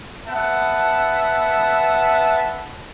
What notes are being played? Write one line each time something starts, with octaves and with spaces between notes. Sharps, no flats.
B3 E5 F#5 A5